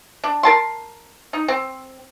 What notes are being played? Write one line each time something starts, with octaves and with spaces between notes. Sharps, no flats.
D4
A#4 A5 C6
D#4
C4